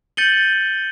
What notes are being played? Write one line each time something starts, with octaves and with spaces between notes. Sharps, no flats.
G6 A6 C#7 D#7 F#7 G7